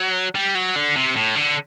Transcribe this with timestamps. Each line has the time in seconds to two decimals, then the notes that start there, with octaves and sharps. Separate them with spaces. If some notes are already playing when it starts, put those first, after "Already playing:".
Already playing: F#3
0.35 G3
0.55 F#3
0.76 D3
0.96 C3
1.16 A2
1.36 D3